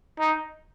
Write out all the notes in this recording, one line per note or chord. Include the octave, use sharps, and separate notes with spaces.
D#4